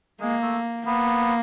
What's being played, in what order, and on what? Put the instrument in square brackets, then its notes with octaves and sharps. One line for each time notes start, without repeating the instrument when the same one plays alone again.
[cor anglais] G#3 [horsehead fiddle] A#3
[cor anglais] A3
[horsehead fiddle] A#3 [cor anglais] B3